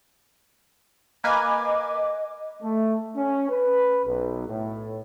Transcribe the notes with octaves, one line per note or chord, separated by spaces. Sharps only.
A#3 B4 D#5 G#5 D6
A3
C#4
B4
B1
A2